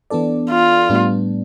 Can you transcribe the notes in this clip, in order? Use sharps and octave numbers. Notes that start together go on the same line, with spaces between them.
E3 B3 D4 A4 D5
F4
A2 G3 B3 D4